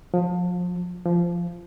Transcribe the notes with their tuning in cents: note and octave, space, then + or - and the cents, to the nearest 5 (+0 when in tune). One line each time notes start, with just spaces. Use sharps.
F3 +30
F3 -15